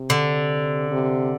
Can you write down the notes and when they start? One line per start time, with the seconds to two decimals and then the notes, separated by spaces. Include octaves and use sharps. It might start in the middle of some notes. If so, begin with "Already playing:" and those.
Already playing: C3
0.10 D3
0.91 C3